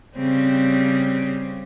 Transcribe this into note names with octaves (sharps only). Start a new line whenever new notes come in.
C#3 G3 C4